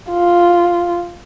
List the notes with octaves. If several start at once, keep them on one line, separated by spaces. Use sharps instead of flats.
F4